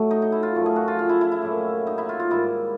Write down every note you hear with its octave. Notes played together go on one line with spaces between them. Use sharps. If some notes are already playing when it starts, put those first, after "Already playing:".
Already playing: A2 F#3 A3
D#4
D#4
E4
F4
F#2 C#3 F3 A3
G#4
F#4
F4
F4
E4
E4
E4
A2 F#3 A#3
D#4
E4
F4
F4
G#2 D#3 G3 E4